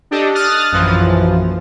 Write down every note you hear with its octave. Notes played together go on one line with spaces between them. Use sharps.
D4 G4 A4 D#5
D#6 F6 F#6 A6
A#1 F#2 E3 F3